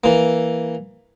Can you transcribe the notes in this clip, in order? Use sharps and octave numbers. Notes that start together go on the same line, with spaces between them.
E3 A#3